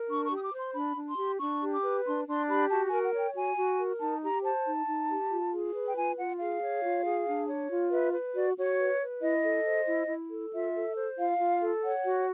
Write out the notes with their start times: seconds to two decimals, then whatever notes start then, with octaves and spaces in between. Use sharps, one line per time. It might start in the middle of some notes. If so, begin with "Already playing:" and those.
Already playing: A#4
0.08 D4 C#6
0.25 C#6
0.31 G4 D#6
0.41 D6
0.53 C5
0.58 C6
0.74 D4 B5
0.96 D4
1.07 C6
1.17 G4
1.39 D4 C#6
1.62 G4
1.73 D6
1.83 B4
2.04 D4 C6
2.26 D4 C6
2.49 G4 B5
2.70 F#4 A5
2.86 A#4 G#5
3.02 F#5
3.13 C#5 G5
3.35 F#4 G#5
3.57 F#4
3.78 A#4
4.00 D#4 A5
4.22 G4 A#5
4.43 C5 A5
4.65 D#4
4.87 D#4
5.09 G4
5.30 F4
5.52 G#4
5.73 B4
5.86 G5
5.96 F4 G#5
6.17 F4 F#5
6.39 G#4 F5
6.61 C#5
6.82 F4
7.04 G#4
7.27 D4
7.48 C#5
7.70 F4
7.91 B4 E5
8.13 B4
8.34 F#4 D5
8.57 F#4 C#5
8.79 B4
9.01 B4
9.22 E4 D#5
9.43 A4
9.65 C5
9.86 E4
10.08 E4
10.30 A4
10.52 F4 E5
10.74 A4
10.95 C5
11.17 F4 F5
11.39 F4
11.60 A4
11.82 C#5 F#5
12.04 F#4